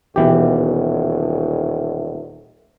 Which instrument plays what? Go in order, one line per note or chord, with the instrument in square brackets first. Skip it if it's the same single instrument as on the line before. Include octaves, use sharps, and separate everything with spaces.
[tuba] D#1 [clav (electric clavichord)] B2 E3 G4